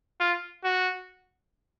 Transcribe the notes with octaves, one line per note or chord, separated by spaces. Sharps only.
F4
F#4